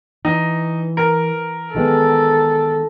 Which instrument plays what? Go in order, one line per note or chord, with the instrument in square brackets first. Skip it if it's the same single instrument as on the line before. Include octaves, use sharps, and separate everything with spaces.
[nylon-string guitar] E3 [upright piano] D#4
[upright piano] A#4
[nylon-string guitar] D#3 G#3 B3 [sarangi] A4